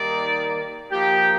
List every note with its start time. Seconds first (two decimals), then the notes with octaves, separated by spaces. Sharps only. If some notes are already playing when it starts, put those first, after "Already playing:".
Already playing: D#3 G3 A#3 D#4 D5
0.91 F3 A#3 D#4 G4